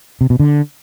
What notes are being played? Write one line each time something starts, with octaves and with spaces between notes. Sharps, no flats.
C3
B2
D3